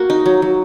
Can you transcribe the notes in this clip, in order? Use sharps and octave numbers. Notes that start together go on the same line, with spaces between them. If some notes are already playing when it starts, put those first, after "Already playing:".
Already playing: A#3 F#4
D#4
F#3
F#3